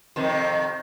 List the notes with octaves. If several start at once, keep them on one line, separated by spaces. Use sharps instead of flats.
F2 C3 D#3